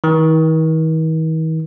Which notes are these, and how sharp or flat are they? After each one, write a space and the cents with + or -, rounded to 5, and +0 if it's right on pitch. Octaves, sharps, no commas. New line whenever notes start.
D#3 +45